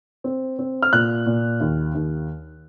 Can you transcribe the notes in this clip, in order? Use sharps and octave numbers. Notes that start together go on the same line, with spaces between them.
C4
C4
F6
A#2 F#6
A#2
D#2
D#2